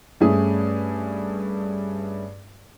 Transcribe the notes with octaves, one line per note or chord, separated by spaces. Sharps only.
G2 A3 C#4 G#4 D#6